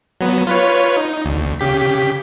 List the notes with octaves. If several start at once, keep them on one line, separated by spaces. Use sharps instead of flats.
F#3 B3
F4 B4 C#5
D#4
D2
C#3 G4 B6